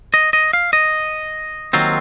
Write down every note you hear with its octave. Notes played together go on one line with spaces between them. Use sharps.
D#5
D#5
F5
D#5
D#2 D#3 F#3 C4 F4